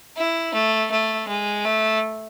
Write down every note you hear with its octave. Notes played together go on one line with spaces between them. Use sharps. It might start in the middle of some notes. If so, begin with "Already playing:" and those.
E4
A3
A3
G#3
A3